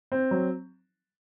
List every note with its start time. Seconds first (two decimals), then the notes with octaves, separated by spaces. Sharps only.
0.12 C4
0.31 F#3